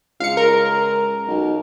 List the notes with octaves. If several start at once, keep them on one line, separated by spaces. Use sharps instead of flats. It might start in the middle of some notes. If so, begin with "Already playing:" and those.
C#2 F5 C#7
A#4
B1